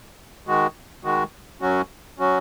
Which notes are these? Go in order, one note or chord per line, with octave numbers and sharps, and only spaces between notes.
D#3 G#3 F#4
D#3 G#3 F#4
F#2 F#3 C#4 F#4
F#3 C#4 F#4